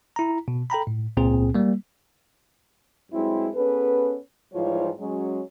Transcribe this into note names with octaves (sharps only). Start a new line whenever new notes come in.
E4 A#5
B2
A4 G5 A#5 B5
A2
C#2 A#2 C4 G#4
G3 A#3
G2 F#3 G#3 C4 E4
B3 C#4 G#4 A4 B4
G#2 E3 F3 G3 F4 C#5
F#3 G#3 C#4